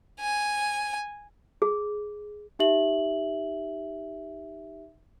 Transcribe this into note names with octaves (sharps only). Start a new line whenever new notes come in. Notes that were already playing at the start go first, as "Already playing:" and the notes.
G#5
G#4
D#4 G4 E5 F#7